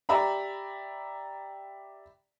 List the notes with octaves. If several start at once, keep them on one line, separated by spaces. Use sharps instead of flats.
G4 D5 E5 A#5 B5